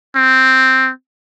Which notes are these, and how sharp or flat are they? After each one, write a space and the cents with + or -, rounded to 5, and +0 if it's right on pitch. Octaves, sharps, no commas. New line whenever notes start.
C4 +0